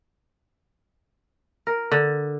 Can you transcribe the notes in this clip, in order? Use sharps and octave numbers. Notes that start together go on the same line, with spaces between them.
A#4
D3